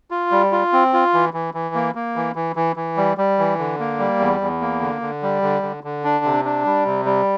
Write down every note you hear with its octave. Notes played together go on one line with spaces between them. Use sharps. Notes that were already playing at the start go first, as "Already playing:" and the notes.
F4
G3
F4
C4
F4
E3
E3
E3
A#3
A#3
E3
E3
E3
E3
G3
G3
E3
D3
A#3
G3
E2
E2
A#3
D3
D3
G3
D3
D3
D3
D4
C3
D4
G3
C3
G3